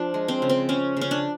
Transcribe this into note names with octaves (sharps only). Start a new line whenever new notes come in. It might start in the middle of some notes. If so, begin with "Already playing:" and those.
Already playing: F3 D4
G#3
C4
C#3
C4
C#3 C#4
C#3 C#4
D4